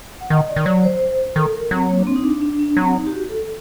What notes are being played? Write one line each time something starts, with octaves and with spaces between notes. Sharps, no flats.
F#5
D#3 D#5
D5
D#3
F#3 D5
C5
D#3 A4
A#4
F#3 C4
A#3
D4
C4
D#4
D4
D4
D4
F#3 C4
D#4
G4
F#4
A4